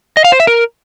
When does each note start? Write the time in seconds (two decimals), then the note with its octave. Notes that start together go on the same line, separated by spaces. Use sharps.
0.17 D#5
0.24 F5
0.32 C5
0.40 E5
0.47 A#4